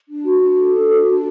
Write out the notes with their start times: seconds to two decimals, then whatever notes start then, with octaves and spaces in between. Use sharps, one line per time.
0.09 D4
0.25 F#4
0.41 D4
0.58 A4
0.74 D4
0.90 F#4
1.07 D4